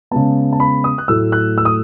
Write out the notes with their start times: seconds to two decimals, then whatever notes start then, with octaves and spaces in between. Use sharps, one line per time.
0.11 C#3 G#3 B3 A5
0.53 A5
0.60 B5
0.84 D#6
0.98 F#6
1.08 A2 F#3 A3 E6
1.32 F#6
1.58 E6
1.65 D#6